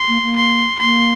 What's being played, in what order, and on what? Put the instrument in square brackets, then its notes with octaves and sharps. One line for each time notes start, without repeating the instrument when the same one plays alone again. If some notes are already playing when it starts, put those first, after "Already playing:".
Already playing: [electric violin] C6
[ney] A#3
A#3
[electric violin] C6
[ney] A#3 [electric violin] C6